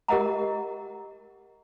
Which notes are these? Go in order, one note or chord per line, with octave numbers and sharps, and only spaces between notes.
G4 A#4 D#5 F#5 A#5